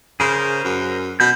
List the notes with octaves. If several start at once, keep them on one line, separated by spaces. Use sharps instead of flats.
C#3 G#4 A#4 C5
F#2
B2 G6